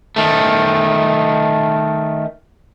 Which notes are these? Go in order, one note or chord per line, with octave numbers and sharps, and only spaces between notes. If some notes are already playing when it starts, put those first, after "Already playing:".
D#3 A3